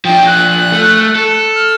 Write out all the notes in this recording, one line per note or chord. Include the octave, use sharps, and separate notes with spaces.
F3 D4 G5
F#6
A3
A4
F6